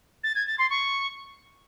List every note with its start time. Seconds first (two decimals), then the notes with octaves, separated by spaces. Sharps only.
0.24 A6
0.35 G#6
0.47 A6
0.58 C6
0.70 C#6